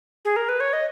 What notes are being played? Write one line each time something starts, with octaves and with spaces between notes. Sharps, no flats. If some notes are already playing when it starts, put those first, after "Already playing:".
G#4
A#4
B4
C#5
D#5